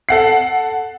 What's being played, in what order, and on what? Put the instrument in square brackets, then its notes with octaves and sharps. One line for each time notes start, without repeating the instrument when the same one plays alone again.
[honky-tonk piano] A4 F#5 C7